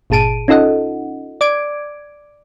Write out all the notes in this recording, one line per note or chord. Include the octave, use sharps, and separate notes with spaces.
G1 A#2 G#4 A5 D7 D#7
C#4 D#4 F4 A4 D#5 F#5
D5 D6 G#6 D7